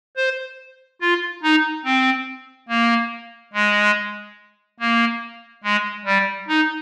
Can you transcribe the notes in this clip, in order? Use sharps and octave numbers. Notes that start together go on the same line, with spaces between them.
C5
F4
D#4
C4
A#3
G#3
A#3
G#3
G3
D#4